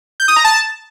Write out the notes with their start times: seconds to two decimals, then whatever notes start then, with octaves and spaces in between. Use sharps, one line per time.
0.20 G6
0.28 D#6
0.36 A#5
0.44 A5